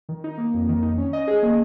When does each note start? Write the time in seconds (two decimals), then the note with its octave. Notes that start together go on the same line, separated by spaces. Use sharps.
0.09 D#3
0.24 D#4
0.38 A#3
0.54 F2
0.69 D#3
0.82 D#4
0.98 C#4
1.13 D#5
1.27 G#4
1.43 A#3